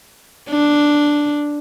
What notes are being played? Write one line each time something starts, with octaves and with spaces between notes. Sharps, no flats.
D4